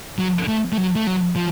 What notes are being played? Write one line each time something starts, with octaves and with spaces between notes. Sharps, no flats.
F#3
A3
A3
F#3
A3
F#3
F3